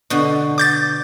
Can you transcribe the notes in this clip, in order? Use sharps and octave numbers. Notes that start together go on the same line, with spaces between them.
B2 D3
D6 G6 A6